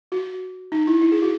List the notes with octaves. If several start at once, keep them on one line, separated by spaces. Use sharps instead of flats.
F#4
D#4
E4
E4
G#4
F#4